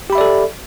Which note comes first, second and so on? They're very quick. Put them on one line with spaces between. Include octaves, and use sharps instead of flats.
G4 B5 E5 D5 A4